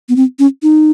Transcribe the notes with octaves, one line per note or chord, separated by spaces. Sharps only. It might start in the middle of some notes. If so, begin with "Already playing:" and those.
B3
C4
C#4
D#4